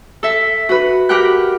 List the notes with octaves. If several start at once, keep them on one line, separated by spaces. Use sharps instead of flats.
A4 E5
F#4 B4
G4 A#4 F#5 G5 F#6